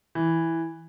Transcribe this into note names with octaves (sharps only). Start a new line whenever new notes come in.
E3